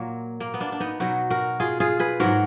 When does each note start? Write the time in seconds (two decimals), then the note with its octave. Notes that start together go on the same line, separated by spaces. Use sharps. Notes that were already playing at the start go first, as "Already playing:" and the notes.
Already playing: A#2 F#3 A#3
0.40 A#3
0.54 B3
0.60 A#3 D4
0.72 D4
0.80 B3 D#4
1.00 B2 F#3 D#4 F#4
1.30 F#4 A#4
1.60 F4 G#4
1.80 F4 G#4
1.99 G#4 B4
2.20 G#2 F#3 F#4 A#4